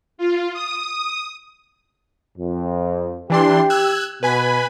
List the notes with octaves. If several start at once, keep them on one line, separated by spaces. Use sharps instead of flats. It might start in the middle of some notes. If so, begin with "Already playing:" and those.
F4
D#6
F2
E3 D4 G4 C6
E6 F#6 G#6
B2 B4 G#5 B5